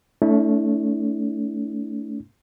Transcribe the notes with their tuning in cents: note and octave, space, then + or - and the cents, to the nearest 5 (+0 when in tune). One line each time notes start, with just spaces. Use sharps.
A3 +0 C#4 +45 E4 -45